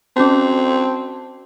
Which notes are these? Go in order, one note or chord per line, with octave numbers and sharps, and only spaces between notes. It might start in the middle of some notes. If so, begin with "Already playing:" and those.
C4 C#4 F#4 A5